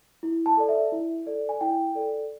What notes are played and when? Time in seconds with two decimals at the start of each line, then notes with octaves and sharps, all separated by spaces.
0.23 E4
0.46 A5
0.57 A4 D5
0.69 E5
0.92 E4
1.26 A4 D5
1.49 G#5
1.61 E4 G5
1.95 A4 D5